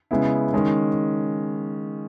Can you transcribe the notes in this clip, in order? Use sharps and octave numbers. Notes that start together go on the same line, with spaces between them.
C#3 G#3 B3 E4
D#3 G#3 C#4